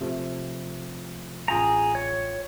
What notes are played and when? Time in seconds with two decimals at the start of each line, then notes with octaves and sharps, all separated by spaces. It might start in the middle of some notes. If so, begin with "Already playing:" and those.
0.01 C3 F3 A3
1.48 A1 F4 G#4 G5 A#5
1.95 C#5